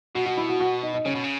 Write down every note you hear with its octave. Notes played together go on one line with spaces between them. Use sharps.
B2 F#4
F#4
E4
F#4
F#4
D#4
D#4
C#3 C#4
B2
C#3